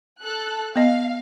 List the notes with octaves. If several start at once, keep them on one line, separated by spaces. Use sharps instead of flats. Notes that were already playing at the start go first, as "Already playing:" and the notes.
A4 F#6
B3 D#5 F5